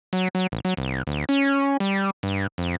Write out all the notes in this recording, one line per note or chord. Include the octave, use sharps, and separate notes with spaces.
F#3
F#3
A1
F#3
C2
D2
C#4
G3
G2
F2